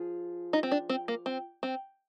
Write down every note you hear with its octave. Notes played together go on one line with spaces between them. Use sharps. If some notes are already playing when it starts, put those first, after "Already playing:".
Already playing: F3 F4 G#4
D#4
C4
D4
C4
A#3
C4
C4